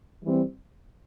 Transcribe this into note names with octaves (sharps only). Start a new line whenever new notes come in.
E3 G3 C4